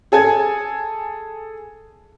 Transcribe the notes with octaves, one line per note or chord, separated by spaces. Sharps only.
G#4 A4 G#5 G#6